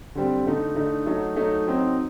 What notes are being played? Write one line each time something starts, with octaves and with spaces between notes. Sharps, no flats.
D3 G3 C4
D3 A3 D#4
D3 A3 D#4
F#3 A3 D#4
F#3 A3 D#4
F#3 C4 D#4